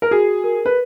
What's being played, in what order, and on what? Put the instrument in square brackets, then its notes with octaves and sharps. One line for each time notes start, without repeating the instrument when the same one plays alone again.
[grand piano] A#4
[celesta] F#4 [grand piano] G#4
[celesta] A#4
[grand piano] B4